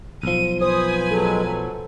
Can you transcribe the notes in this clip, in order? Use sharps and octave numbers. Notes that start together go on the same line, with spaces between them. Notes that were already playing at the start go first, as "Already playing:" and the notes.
B1 F3 D#7
B4 C5 G#5 D#6
F#3 G#3 A4
F#3